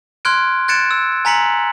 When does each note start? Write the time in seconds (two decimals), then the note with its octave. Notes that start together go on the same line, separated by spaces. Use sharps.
0.25 C6 F6 F#6 G#6 D7
0.68 F#6 G#6 A6 C#7 D7 E7
0.91 E6
1.25 G#5 A#5 B6 C#7 F#7